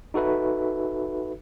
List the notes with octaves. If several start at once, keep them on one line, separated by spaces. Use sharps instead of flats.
D#4 F#4 A4 B4 E5